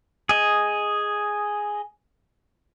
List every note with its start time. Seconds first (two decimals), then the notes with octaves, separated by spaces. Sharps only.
0.29 G#4 D#5